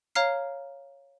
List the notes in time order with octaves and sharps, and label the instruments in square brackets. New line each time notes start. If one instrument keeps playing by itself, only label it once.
[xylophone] C#5 F5 A#5 F6 C7